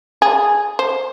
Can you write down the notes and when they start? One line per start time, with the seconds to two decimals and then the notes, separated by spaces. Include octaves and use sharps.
0.22 G#4
0.79 C5